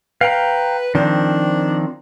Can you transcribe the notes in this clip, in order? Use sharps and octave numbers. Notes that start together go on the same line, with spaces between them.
B4 F5 G5 A#5
D#3 F3 C4 D4